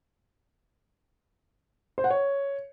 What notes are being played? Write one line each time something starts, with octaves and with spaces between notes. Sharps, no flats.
C5
F#5
C#5